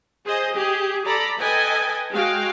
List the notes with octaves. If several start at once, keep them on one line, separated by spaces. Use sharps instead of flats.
G#4 C5 D#5
G4 G#4
A4 D5 A#5 B5
A4 B4 D#5 G5 G#5
G#3 F#4 F5 G5